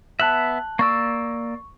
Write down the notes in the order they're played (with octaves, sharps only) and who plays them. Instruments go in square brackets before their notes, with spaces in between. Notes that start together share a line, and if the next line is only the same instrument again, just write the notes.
[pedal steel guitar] B3 E5 [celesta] A5 F#6 F#7
[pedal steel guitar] A#3 D5 E6 [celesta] C#6